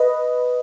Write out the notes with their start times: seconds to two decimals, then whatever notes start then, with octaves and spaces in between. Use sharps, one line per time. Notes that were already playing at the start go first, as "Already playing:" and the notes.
Already playing: B4 D#5